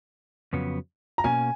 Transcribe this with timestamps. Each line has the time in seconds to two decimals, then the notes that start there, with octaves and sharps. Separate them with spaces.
0.53 F2 C#3 F#3 B3
1.18 A#5
1.24 B2 A#3 C#4 G#5